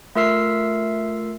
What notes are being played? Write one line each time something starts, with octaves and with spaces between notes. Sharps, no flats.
A3 F4 A#4 E5 E6 C7